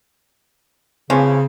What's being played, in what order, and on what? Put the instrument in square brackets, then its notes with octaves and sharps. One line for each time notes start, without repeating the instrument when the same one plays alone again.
[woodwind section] C#3 [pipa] E3 F3 C#4 [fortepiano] C4